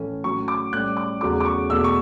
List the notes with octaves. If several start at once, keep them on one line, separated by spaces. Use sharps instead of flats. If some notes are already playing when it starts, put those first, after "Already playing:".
Already playing: A2 E3 A3 C#4
A2 F#3 C#4 C#6
D6
A2 G3 C#4 F#6
D6
E2 C#3 F#3 A3 C#4 D6
D6
C#6
E2 B2 A3 E6
C#6